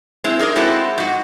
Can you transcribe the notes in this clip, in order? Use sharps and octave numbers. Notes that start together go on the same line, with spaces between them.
G#3 C4 E4
D#4 G#4 A#4 D5
G#3 C4 E4 F#4 A4
G#2 F#4